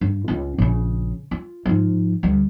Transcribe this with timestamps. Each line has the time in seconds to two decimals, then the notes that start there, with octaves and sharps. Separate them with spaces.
0.01 G2
0.28 C#2 F4
0.58 A#1 C#3
1.31 F4
1.66 G#2 F3
2.23 D2 G3